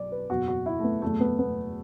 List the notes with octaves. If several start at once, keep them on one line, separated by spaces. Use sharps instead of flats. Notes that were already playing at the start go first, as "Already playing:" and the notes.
Already playing: B1 B2 D5
B4
F#1 E2 B2 F#4
F#4
E4
A3
B3
F#1 E2 B2 A3
B3
B3